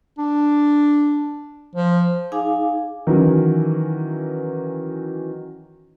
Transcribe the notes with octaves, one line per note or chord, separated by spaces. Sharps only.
D4
F3
D#4 G#4 F5 G#5 D6
D#3 E3 F#3 C#4